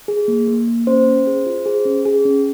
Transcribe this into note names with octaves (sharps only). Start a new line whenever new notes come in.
G#4
A#3
A#3
A#3
C#4 C5
C#4
G#4
F4
G#4
C#4
G#4
C#4